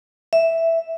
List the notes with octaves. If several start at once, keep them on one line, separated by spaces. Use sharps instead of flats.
E5